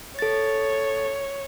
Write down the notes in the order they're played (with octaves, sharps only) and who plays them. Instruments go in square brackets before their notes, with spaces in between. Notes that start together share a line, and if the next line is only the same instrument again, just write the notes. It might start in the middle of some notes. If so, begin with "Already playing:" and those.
[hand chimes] A4 A6 [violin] C#5